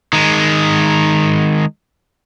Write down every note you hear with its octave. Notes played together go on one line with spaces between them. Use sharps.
D#3 G#3